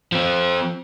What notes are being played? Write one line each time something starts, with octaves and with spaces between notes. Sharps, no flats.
F3 C4